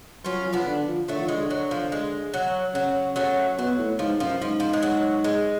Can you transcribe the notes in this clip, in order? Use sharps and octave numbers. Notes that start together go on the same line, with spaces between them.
F#3 C#4 F4
F3
B3 D4
D3
F3
D3 F#3 A3
F3
D3 G#3
F#3
F3
G#3
F#3
C#3 F#3
F#3 A3
B2 F#3
A2
G#2 F3
F#2 F3
G#2 F3
F3
G#3
F#3
G#3